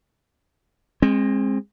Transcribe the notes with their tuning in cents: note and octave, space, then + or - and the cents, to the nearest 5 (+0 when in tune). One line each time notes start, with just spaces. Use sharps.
G#3 -15 C4 +25